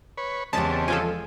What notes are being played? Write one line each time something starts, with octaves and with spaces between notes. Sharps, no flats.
B4 C#5
E2 C#3 G#3 C4 G4 A5
F3 F4 A4 G#5